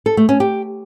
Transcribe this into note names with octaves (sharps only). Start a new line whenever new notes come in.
A4
A3
C#4
G4